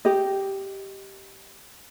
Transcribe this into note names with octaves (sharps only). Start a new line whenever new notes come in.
G4 D#5